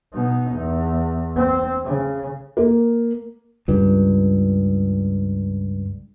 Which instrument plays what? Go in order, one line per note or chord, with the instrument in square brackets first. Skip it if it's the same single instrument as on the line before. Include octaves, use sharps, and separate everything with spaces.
[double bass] B2 D#4
E2
C4
C#3
[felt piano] A#3
[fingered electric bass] C#2 G2